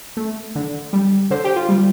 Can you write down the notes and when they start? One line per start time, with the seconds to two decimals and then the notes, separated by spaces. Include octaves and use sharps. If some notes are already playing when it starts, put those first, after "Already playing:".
0.17 A3
0.55 D3
0.93 G3
1.30 D3 C5
1.44 G4
1.56 F4
1.69 G3